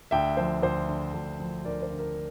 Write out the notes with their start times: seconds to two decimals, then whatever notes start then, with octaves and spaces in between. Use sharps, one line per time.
0.11 D2 E5 G5
0.37 F3 C5 E5
0.62 D2 C5
0.88 D3
1.14 D2
1.39 F3
1.65 D2 A#4 D5
1.82 C5
1.90 D3
1.99 A#4